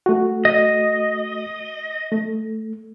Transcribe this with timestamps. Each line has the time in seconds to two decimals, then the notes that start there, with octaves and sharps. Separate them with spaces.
0.06 A3 F#4
0.45 D#5
2.12 A3